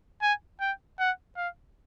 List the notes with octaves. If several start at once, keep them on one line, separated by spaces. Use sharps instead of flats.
G#5
G5
F#5
F5